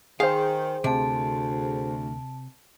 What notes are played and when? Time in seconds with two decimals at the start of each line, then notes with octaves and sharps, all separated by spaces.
0.20 D#3 G#4 C5 F5 G5
0.84 D2 C3 A5 D7